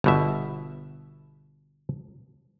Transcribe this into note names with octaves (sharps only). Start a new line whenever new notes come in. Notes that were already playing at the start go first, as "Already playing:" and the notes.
G1 B2 E5